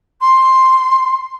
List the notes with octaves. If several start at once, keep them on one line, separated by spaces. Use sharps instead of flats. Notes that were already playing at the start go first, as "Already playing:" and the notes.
C6